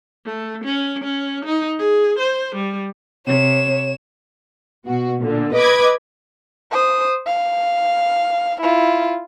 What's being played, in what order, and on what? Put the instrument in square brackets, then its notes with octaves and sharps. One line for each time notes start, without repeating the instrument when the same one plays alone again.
[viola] A3
C#4
C#4
D#4
G#4
C5
G3
[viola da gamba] C3 [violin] C#5 E7
[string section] B2 F#4
A#2 D3
B4 D#5 B5 D6 G#6
[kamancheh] C5 D#6
F5
E4 F4